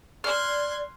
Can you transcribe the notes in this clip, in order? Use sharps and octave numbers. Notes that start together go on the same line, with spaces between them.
D5 C6 F6 F#6 G#6